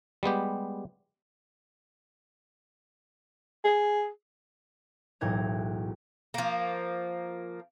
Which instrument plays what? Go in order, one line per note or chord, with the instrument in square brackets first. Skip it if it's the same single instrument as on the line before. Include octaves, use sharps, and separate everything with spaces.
[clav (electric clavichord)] G3 G#3 B3 G4
[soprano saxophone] G#4
[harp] E1 B1 A2 A#5 G#6
[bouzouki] F3 A#3